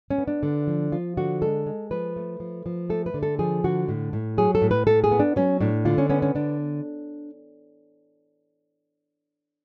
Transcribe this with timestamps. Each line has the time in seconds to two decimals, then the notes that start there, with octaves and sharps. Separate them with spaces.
0.10 C#4
0.18 B3
0.27 D4
0.43 D3
0.67 F3
0.92 F3 F4
1.17 D3 F#4
1.41 G#3 A4
1.66 G#3
1.91 F3 B4
2.16 A3
2.40 F3
2.66 F3
2.90 A3 A4
3.06 B4
3.14 D3
3.23 A4
3.39 F3 G#4
3.64 D3 F#4
3.88 A2
4.13 A2
4.38 F#3 G#4
4.55 A4
4.62 A2
4.71 B4
4.87 A2 A4
5.04 G#4
5.12 B3
5.19 D4
5.36 F#3 C#4
5.61 A2 D4
5.85 D3 F4
5.98 C#4
6.10 B3 C#4
6.22 C#4
6.35 D3 D4